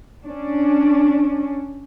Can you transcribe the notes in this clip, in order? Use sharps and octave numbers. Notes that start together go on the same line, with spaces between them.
C#4 D4